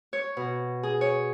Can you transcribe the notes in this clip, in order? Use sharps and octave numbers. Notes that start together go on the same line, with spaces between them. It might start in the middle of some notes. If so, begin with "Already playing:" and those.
C#5
B2
G#4
C#5